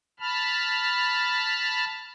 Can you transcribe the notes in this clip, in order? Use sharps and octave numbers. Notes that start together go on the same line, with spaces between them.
A5 B5 F6